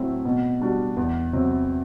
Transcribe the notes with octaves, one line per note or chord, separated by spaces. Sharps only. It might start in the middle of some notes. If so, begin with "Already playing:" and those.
Already playing: A2 F#3 A3 C4 E4
B2
G3 D4 F#4
E2
C3 F#3 C4